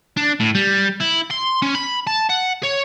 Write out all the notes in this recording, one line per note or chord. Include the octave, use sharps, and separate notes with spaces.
D4
A2
G3
E4
C6
C#4
B5
A5
F#5
C#5